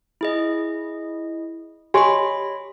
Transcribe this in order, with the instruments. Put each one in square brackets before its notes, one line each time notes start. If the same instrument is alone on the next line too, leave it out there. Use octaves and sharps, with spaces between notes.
[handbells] E4 G#4 D#5
[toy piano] G4 G#5 C6 [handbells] C#5 D#5 B5